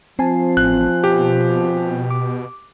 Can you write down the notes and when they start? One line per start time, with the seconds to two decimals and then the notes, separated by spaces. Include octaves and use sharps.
0.19 F3 C4 G#5 A5
0.57 A1 F#6
1.04 B2 G4
2.10 D6